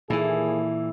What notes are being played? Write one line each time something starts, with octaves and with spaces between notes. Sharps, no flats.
D#2 A#2 E3 E4 G#4 A4